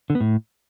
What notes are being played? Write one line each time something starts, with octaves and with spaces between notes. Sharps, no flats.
D3
B3
A2